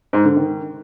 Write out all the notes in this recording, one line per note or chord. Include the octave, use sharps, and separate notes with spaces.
G#2
D3
D#3